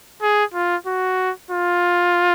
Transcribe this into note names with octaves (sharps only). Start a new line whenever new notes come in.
G#4
F4
F#4
F4